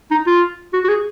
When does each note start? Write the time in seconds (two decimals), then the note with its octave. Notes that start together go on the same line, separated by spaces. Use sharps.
0.11 D#4
0.27 F4
0.73 F#4
0.85 F#4
0.89 G#4